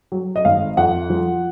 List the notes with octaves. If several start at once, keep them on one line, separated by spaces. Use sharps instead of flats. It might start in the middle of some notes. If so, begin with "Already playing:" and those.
F#3
D#5
G#1 F5
F2 F#5
F3